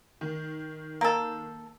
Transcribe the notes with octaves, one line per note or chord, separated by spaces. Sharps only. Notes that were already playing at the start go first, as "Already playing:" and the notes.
D#3
A#3 A4